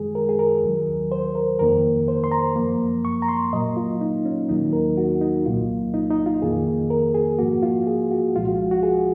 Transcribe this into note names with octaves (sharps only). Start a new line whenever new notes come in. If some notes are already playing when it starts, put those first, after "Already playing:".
Already playing: F#2 D#3 G#3 G#4
A#4
G#4
A#4
D#2 D#3 F#3
C5
A#4
F2 D#3 A#3 A#4
C5
C6
A#5
F#2 F3 A#3
C#6
A#5
C6
A#2 F#3 A#3 D#5
F4
D#4
C#4
D#2 D#3 F#3 A#3 D#4
A#4
F#4
D#4
C2 A#2 F#3 A#3 F4
D#4
D#4
F4
F2 D#3 A#3 G#4
A#4
G#4
G#2 F3 A#3 F#4
F4
G#4
F#4
C2 A#2 F3 G#3 F4
F#4
F#4
G#4